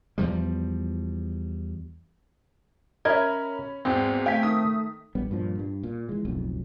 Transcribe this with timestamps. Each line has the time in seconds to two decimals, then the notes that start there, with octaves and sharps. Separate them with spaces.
0.18 E2 F3 G3
3.05 C#4 A#4 D#5 E5 B5 G#6
3.85 G#1 E2 C4 G4
4.26 A3 F5 G5 G#5 B6
4.43 D#3 D#6
5.15 A#1 G3 B3
5.31 G2 A#2 F3
5.59 G2
5.83 A#2
6.09 E3 G#3
6.25 D1 B1 F2